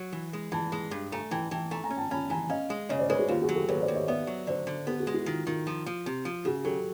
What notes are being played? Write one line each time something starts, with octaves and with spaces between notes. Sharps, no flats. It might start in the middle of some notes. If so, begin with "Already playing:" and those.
Already playing: F#3
E3
G#3
E3 A5 B5
G#3
G2
A3 G#5 A#5
E3 G5 A5
E3 G5 A5
A3 G#5 A#5
G#5 A#5
C#4
G5 A5
C#4 A5 B5
E3 G#5 A#5
C#4 D#5 F5
G#3
C#3 C#5 D#5
C5 D5
G#3 B4 C#5
F#4 G#4
D#2 F4 G4
F#4 G#4
F#3
G4 A4
D#2 B4 C#5
C5 D5
D#2
C#5 D#5
B3 D5 E5
F#3
D3 C5 D5
D3
B3 G4 A4
F#4 G#4
G#3
E4 F#4
D#3 F4
D#3 F4
F3
F3
C3
F3
C#3 F#4 G#4
F#3 G4 A4